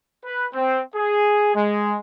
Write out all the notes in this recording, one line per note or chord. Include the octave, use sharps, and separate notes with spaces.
B4
C4
G#4
G#3